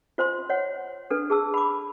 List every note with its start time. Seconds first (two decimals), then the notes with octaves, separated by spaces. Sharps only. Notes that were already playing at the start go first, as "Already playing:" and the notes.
0.18 F4 C5 G#5 C6
0.50 C#5 F#5
1.10 D4 A4 B4
1.30 G#4 A5 E6
1.54 B5 D6